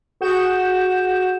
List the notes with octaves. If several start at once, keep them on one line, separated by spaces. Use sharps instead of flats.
F#4 G#4 F#5 G6 E7